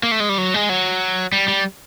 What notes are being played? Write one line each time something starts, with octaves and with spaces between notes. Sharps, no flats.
A#3
A3
G#3
G3
F#3
G#3
F#3
G3
G3